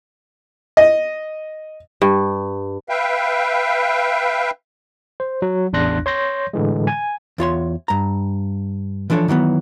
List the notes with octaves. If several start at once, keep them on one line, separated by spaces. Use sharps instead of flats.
D#5
G2
B4 E5 F5 G5
C5
F#3
A1 E2 D4 C6 F#6 A#6
C#5 C6 G6 A#6
A2 D3 E3 G#3
G#5
E2 F4 C#5 C6
G2 A#5
E3 F3 D4 A4 C#5
D#3 E3 F#3 B3